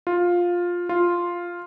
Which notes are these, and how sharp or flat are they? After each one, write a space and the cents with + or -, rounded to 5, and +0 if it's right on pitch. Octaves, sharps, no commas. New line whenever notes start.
F4 +10
F4 +0